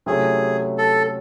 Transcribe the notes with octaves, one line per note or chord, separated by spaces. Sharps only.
C3 F#3 A3 C#4 E4 G#4
A4